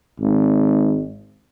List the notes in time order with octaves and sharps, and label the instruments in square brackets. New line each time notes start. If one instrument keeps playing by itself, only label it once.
[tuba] G#1